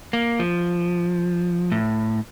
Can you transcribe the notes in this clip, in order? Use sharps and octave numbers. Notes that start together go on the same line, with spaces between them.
A#3
F3
A2